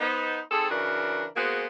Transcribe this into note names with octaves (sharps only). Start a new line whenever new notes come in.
B3 D#4 C5
G#2 C4 G#4 A4
C#3 E3 D4 F#4 A#4
G#3 A#3 B3 F#4 G#4 C5